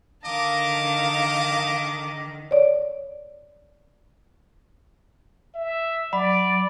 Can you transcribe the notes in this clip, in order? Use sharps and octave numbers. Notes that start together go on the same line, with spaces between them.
D3 D#3 A#4 D#5 F5 A5 D6
C#5 D5
E5
F#3 D5 B5